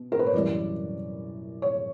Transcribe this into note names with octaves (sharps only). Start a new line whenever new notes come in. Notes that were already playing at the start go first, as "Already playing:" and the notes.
Already playing: B2
A#4
B4
C#5
F#2 E3 G3 D5
C#5